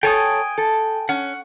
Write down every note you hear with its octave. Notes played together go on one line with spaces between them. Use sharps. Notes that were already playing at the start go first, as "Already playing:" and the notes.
A4 C#5 G5 G#5 D#6
A4
C#4 F#5